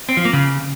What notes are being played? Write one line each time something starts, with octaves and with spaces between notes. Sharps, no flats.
C4
F3
A#3
C#3